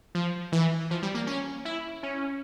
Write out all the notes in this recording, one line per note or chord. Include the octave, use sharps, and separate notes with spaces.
F3
E3
F3
G3
A#3
C#4
E4
C#4